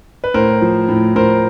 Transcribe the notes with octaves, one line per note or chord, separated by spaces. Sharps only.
B4
A2 A#4 C5
F3
A2
A2 A#4 C5